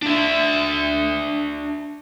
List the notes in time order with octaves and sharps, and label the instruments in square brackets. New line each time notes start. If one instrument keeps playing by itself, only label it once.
[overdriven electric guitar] D4 E5